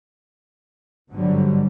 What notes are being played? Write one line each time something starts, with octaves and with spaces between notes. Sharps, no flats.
G1 G#2 D3 F#3 G3